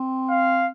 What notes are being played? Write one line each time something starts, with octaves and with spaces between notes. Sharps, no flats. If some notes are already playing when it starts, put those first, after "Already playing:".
Already playing: C4
F5